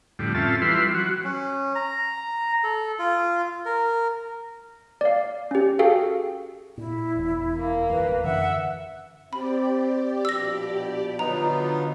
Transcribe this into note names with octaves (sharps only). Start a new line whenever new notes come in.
F2 A2 D3 G3
C4 C#4 F4 A4 E5 A5
E3 G3 E4 F4 B4 C6
F#3 F#4
C#4
A#5
A4
F4
A#4
D5 F5
C#4 G4
F#4 G#4 A4 F5 G5
A#2 E4
E1 E2
A#3
G1 E2 G2 B4
F#2 D3 E3 E5 F#5
C4 G4 D5 B5
A#1 G2 B2 E6 A#6
D3 F#3 B3 D#4 F4 A#5